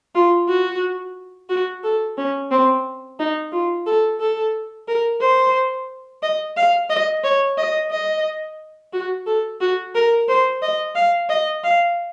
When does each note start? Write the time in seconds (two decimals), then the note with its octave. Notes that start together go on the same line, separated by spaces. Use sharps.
0.15 F4
0.48 F#4
1.49 F#4
1.84 A4
2.17 C#4
2.51 C4
3.19 D#4
3.52 F4
3.86 A4
4.20 A4
4.88 A#4
5.21 C5
6.22 D#5
6.57 F5
6.90 D#5
7.24 C#5
7.57 D#5
7.91 D#5
8.93 F#4
9.26 A4
9.61 F#4
9.95 A#4
10.28 C5
10.62 D#5
10.95 F5
11.29 D#5
11.64 F5